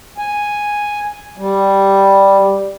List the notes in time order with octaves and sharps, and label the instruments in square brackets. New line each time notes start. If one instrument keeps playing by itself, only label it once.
[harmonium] G#5
G3